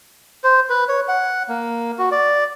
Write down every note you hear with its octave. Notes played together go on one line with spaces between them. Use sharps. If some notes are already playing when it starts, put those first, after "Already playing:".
C5
B4
C#5
F#5
A#3
F#4
D5